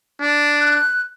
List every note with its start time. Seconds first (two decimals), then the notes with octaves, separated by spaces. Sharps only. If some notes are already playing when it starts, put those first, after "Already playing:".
0.21 D4
0.59 F#6